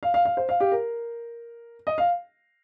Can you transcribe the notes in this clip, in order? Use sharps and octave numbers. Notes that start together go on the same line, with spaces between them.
F5
F5
F5
C5
F5
G4
A#4
D#5
F5